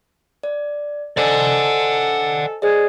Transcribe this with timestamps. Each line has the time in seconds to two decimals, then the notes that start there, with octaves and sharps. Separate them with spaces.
0.43 D5
1.17 A4 C5 D5 D#5 F#5 G#5
2.62 G#4 C5 D5 D#5